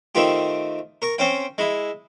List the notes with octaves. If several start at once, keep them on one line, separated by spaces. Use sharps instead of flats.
D#3 A3 C4 F4 G4
A#4 C#6
C4 C#4 C5 F5 G5
G#3 E4